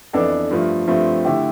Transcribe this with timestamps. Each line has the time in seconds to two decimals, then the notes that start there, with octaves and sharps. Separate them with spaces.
0.13 F2 E3 B3 D4 A4
0.50 G2 F3 A3
0.87 G2 F3 A3 C4
1.24 D3 A3 E4 G4